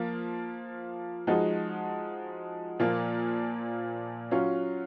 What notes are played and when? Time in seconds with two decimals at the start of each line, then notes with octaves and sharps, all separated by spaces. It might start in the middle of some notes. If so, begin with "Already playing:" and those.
Already playing: F3 A#3 F4
1.27 F3 G#3 D#4 F#4
2.79 A#2 F3 A#3 F4
4.31 F#3 C#4 F4